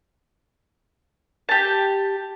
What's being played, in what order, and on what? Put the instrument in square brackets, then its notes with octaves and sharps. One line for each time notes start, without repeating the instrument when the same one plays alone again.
[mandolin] G4 A5